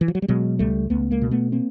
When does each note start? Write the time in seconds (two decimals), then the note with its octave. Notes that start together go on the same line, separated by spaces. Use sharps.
0.01 E3
0.08 F3
0.15 F#3
0.22 G3
0.28 B2 F#3 G#3
0.59 C#2 G3 A3
0.90 C#2 A3 B3
1.11 G#3 A#3
1.22 B2
1.31 A3 B3
1.52 A#3 C4